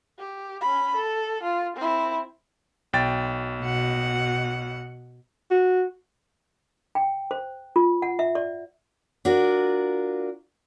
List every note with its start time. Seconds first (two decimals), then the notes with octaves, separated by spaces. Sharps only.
0.19 G4
0.61 C#4 B5
0.95 A4
1.43 F4
1.77 C4 E4
2.93 B1 G5 A6
3.62 B2 F#5
5.51 F#4
6.95 G5
7.31 C5
7.76 F4
8.02 F#5
8.19 E5
8.35 D5
9.25 D4 F4 F#4 A#4